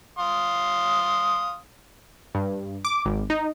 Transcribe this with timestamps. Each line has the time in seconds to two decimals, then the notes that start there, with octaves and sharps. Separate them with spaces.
0.18 F5 C6 D#6
2.35 G2
2.85 D6
3.05 G#1
3.30 D#4